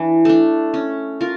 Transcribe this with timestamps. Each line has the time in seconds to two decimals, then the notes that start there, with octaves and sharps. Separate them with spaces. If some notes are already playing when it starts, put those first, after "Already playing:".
Already playing: E3 D4
0.25 A3 D4
0.74 C#4
1.21 F4 A#4